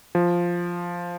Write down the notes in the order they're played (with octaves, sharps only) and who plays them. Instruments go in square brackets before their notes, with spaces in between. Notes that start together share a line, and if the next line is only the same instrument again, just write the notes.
[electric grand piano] F3